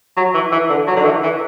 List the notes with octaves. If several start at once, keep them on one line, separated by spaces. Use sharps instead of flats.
F#3
E3
E3
D3
F#3
D3
E3
E3